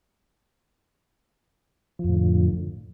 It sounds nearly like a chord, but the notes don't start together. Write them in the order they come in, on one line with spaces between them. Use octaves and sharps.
F3 F2 A2 D3